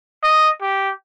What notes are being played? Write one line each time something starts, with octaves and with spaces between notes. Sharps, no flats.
D#5
G4